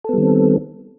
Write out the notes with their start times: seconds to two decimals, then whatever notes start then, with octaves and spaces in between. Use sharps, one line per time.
0.04 A4
0.09 B3
0.13 G3
0.18 D#3
0.22 C4